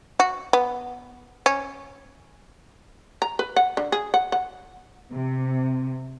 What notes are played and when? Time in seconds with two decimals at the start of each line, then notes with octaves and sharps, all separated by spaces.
0.20 F#4
0.53 B3
1.46 C#4
3.22 A#5
3.39 B4
3.56 F#5
3.77 D3
3.92 G#4
4.14 F#5
4.32 F#5
5.11 C3